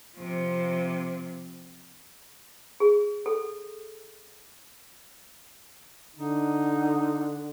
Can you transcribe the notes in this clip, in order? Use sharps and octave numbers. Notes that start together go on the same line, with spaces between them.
C3 F3
G#4
A4
D3 D#4